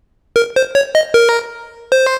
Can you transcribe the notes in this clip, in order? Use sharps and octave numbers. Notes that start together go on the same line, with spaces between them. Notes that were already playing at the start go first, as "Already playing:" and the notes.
A#4
C5
C#5
D#5
A#4
C5